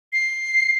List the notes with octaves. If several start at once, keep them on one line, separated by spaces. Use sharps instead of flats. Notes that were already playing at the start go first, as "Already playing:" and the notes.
C7